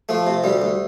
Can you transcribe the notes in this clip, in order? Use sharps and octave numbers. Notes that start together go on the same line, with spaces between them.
F3 A3
C3
D2 G3
D2